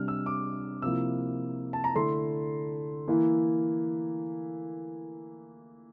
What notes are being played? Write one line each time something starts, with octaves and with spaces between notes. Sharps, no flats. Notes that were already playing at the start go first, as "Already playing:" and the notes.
Already playing: C3 G3 D4 F6
E6
D6
C3 F3 A#3 E4 E6
A5
A#5
D3 A3 E4 C6
E3 A#3 E4